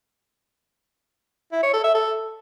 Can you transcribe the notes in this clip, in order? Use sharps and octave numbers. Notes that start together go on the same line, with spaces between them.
E4
C#5
A4
E5
A4